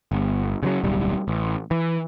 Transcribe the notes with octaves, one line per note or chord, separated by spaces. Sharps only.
G1
C#3 F3 F#3
D1 B1 G3
A1
E3